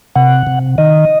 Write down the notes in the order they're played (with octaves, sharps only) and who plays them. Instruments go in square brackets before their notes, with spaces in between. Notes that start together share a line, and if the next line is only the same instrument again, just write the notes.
[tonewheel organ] C3 F#5
C3
D#3 D#5